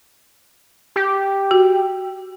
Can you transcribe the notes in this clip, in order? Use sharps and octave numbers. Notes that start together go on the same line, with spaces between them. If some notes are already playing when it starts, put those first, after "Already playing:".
G4
F#4